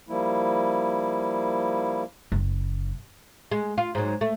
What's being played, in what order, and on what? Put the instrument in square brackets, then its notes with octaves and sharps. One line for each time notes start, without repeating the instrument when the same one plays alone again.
[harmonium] F3 G3 A#3 E4
[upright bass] F#1
[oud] G#3
F4
G#2 F#3
A3